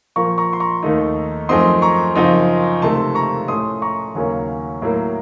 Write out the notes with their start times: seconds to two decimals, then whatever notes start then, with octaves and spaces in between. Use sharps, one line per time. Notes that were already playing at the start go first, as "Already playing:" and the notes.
0.16 A#2 F3 A#3 A#5 C#6
0.38 A#5 C#6
0.53 C6
0.60 A#5 C#6
0.83 D#2 D#3 A3 D#4
1.49 F#2 F3 A3 C4 D#4 C6 D#6
1.82 A#5 C#6
2.15 F#2 C#3 F3 C4 D#4
2.82 C#2 C3 D#3 A3 A5 C6
3.15 A#5 C#6
3.48 A2 A3 C#4 C6 D#6
3.82 A#5 C#6
4.15 D#2 C#3 F#3 A#3 C#4
4.82 A2 F#3 A#3